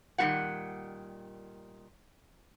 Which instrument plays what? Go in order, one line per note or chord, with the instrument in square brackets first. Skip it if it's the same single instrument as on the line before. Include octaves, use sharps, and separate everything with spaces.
[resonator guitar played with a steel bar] A#2 D#3 G3 B3 F#4 F#5